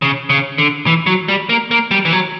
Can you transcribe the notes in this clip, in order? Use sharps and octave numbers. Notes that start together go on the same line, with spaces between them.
C#3
C#3
D3
E3
F#3
G3
A#3
A#3
G3
E3
F#3